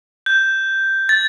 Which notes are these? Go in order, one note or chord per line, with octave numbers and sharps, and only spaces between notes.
G6
A6